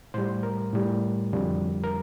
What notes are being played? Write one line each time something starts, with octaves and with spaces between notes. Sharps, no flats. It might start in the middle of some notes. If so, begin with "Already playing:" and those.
A2 G3 C5
A#4
A2 G3
F2 D3 G3
A#4